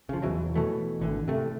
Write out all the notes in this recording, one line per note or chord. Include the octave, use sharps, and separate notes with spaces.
C#3 F3
E2 B2 E3 F#3
B2 E3 A3
G#1 D3 E3
C3 A3